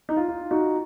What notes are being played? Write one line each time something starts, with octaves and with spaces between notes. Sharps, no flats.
D#4
F4
F4
D#4 F#4